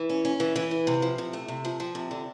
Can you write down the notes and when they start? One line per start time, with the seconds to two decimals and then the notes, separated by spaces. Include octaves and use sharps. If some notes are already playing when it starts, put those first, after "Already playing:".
Already playing: E3
0.09 C#4
0.25 C#4
0.40 E3
0.56 E3
0.71 E4
0.87 C3
1.02 F3
1.18 C3
1.33 A3
1.48 C3
1.65 F3
1.80 F3
1.95 C3
2.11 D3